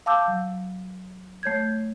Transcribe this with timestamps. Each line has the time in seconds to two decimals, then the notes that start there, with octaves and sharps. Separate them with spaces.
0.06 F5 A5 D6 E6 G6
0.28 F#3
1.43 A3 C#5 G6 G#6